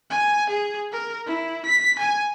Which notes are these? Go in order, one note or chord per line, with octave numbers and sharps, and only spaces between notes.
G#5
G#4
A#4
E4
B6
G#5